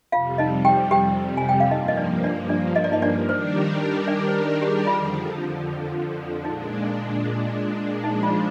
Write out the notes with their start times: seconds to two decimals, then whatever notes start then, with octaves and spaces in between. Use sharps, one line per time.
0.12 F2 C3 G3 F4 F5
0.38 D#4 D#5
0.65 G4 G5
0.91 G4 G5
1.37 G#5
1.49 G5
1.60 F5
1.71 G2 F3 A#3 D#4 D#5
1.88 D#5
1.97 D4 D5
2.24 D4 D5
2.49 D4 D5
2.76 D#5
2.84 D5
2.92 D#4 D#5
3.02 D4 D5
3.28 D#3 G3 D4 G4 A#4 C5
4.07 D4 D5
4.28 C5
4.61 G4
4.68 G#4
4.87 F2 D3 F3 F4
6.45 A#2 G#3 D4 D#4
8.03 F3 G#3 D4 D#4
8.23 F4